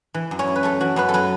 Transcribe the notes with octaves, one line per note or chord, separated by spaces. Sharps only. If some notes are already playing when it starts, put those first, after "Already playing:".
E3
F#2
C#4 C#5
E4
B4
A3 C#4 A4
E3 F#4
F#2 B3 B4
A4
F#3 B3 B4